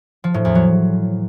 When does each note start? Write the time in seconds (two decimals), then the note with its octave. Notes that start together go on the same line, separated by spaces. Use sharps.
0.24 F3
0.34 A2
0.45 E2
0.55 F#3